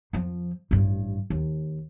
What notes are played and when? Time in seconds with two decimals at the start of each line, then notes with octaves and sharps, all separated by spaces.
0.13 F2 F3
0.71 A1 G2
1.30 D#2